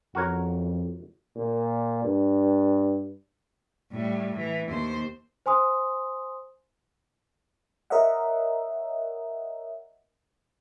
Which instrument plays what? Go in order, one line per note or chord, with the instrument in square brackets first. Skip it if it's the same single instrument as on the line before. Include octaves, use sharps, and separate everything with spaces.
[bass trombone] F2 [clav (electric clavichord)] F#4 A#4 C#5
[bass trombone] A#2
G2
[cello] A2 G3
E3
D#2 C5
[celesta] C5 G#5 C6 D#6
[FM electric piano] A#4 C#5 D#5 E5 F#5